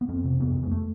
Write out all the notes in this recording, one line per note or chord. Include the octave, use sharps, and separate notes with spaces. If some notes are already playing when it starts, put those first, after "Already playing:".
B3
F2 C4
C3
F2 B3
F2
G#3
A3